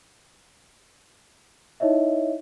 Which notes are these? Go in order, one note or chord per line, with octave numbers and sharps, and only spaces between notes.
D#4 E4 C#5 D#5 E5